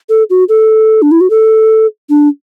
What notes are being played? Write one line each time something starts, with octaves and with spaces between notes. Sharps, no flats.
A4
F#4
A4
D4
E4
F#4
A4
D4